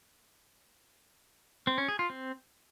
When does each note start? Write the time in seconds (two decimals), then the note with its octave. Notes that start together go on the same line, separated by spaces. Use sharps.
1.67 C4
1.78 C#4
1.88 G#4
1.99 F4
2.10 C4